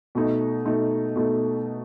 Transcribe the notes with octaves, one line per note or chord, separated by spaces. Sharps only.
B2 A3 D#4
B2 A3 D#4
B2 A3 D#4